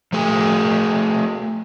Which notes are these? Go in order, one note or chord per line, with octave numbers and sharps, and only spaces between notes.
F3 A3 G#4